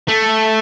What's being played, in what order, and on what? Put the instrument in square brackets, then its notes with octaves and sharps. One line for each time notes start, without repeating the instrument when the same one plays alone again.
[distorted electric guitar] A3